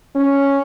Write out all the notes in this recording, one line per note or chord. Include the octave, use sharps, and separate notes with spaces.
C#4